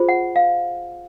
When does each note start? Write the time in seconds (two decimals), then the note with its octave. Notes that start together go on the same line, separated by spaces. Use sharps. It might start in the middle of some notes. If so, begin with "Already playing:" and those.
Already playing: F4 G#4 C5
0.09 F#5
0.36 F5